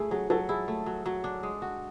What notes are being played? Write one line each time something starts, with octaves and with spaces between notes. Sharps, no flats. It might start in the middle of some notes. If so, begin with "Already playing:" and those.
Already playing: A3 E4 G#4
F#3 G#4
F#3 A4
E4 G#4
A3
F#3
F#3
D4
G#3
F#4